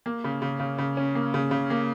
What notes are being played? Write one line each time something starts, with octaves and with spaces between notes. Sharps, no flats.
A#3
C#3
C#3
C#3
C#3
C#4
A#3
C#3
C#3
A#3